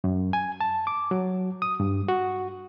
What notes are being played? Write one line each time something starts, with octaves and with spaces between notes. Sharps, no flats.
F#2
G#5
A5
D6
F#3
D#6
G2
F#4